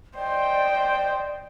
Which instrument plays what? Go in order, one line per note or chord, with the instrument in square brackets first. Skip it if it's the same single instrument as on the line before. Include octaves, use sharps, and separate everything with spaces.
[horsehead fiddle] C5 D#5 [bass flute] D5 [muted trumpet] G5